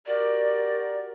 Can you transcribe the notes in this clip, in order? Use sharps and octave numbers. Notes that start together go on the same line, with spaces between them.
F#4 G4 A#4 D5